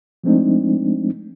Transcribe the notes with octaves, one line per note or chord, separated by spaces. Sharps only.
F3 G#3 A3 C4 D4 D#4